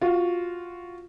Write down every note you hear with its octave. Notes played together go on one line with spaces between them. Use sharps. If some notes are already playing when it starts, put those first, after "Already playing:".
F4 F#4